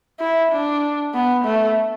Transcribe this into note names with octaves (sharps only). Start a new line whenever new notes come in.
E4
D4
B3
A3